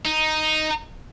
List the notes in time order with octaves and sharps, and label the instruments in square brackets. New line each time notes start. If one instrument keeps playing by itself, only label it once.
[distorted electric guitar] D#4